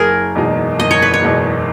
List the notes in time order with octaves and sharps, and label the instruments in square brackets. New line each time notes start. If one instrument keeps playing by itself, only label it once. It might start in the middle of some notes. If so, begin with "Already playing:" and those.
Already playing: [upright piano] F#1 [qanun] G#4 A#4
[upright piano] E2 B2 G#3 D#4
[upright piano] F#1 [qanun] D#5
[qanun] C#5
B4
C#5
[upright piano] E2 B2 G#3 D#4